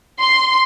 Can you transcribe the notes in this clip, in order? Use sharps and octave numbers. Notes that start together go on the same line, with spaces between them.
C6